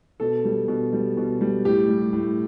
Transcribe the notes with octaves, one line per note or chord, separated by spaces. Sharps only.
B2 A4
G3
B2
G3
B2
G3
A2 G4
G3
A2